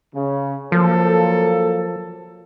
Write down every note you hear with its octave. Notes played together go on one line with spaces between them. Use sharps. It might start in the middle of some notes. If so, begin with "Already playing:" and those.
C#3
F3 F#3 A#3 A4